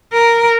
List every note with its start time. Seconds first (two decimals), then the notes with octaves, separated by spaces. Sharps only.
0.13 A#4